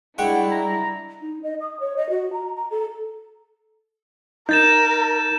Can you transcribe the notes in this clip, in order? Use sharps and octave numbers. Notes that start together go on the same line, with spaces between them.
G3 G#3 D4 E4 F#5 G5 C#6
A#5
D#4
D#5
D#6
C#5
D#5
F#4
A#5
A#5
A4
D#4 A#4 G6 A6 E7